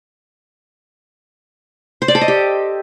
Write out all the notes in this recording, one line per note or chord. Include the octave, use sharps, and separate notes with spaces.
C5
D5
A4
D#5
G4